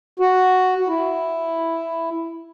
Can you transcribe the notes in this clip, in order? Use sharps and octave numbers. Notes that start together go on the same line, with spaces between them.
F#4
F#4
E4